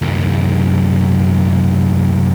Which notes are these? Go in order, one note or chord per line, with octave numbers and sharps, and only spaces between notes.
C2 F#2